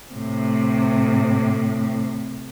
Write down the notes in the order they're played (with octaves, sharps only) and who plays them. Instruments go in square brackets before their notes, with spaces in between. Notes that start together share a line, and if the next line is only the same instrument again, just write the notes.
[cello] A2 C3